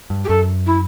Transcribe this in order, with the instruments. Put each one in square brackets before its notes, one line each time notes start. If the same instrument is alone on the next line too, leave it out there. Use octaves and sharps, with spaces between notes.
[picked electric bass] G2
[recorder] G4
[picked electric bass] F#2 [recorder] A4
[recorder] E4